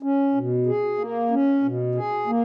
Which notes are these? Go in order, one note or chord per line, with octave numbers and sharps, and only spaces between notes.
C#4
B2
G#4
A#3
C#4
B2
G#4
A#3